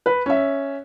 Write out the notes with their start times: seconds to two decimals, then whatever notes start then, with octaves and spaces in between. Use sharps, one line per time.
0.06 B4
0.26 C#4 E5